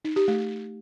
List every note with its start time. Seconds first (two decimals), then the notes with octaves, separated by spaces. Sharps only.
0.05 D#4
0.16 G4
0.28 A3